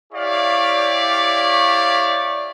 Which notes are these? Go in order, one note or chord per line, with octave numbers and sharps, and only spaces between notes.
E4 G4 C#5 D5 F5